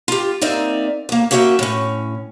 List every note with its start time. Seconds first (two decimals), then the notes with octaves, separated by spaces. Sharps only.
0.08 F4 G4
0.41 A#3 C4 D#4 D5 E5
1.09 D2 A#3
1.31 A#3 C#4 F#4 E5 F5 G5
1.59 A2 C#4